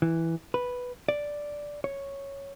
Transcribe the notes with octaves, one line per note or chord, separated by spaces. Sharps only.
E3
B4
D5
C#5